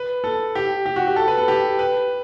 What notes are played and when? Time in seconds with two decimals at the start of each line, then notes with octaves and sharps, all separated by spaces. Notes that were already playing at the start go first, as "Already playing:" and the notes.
Already playing: B4
0.24 A4
0.55 G4
0.86 G4
0.96 F#4
1.07 G4
1.16 A4
1.28 B4
1.38 A4
1.48 G4
1.79 B4